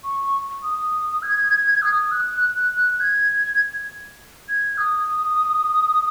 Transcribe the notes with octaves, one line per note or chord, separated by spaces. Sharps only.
C#6
D#6
G#6
D#6
F#6
F#6
F#6
G#6
G#6
D#6